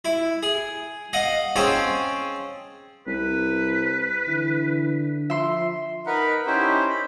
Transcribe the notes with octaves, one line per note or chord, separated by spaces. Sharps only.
E4
G#4
D#5 F5 F#5
C4 C#4 G#4 C#5 F5 A5
C2 B4
D3 E3
F3 E5 C6
D#4 A#4 B4 F#5 B5
C#4 D#4 E4 G4 C5
B5